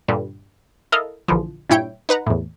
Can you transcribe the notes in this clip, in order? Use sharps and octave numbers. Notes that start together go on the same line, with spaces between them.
G2 A#2 D3
E4 A4 A#4 D#5 F5
A#1 D3 E3 F3
G2 A#2 E4 C#5 G5 D7
D#4 B4 F#5 A#5
E2 A2